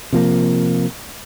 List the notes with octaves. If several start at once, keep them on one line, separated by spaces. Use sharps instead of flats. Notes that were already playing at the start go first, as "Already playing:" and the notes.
C3 F3 A#3